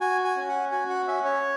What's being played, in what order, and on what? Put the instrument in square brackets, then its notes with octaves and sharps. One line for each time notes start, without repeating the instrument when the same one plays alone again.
[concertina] F#4 G#5
G#5
C#4
F#5
F#4 G#5
F#5
C#4 E5
C#5